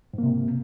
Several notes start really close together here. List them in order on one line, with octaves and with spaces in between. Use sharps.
G#2 A#3 C3